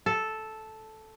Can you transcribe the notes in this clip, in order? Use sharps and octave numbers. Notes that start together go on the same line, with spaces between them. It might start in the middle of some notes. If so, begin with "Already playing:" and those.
A4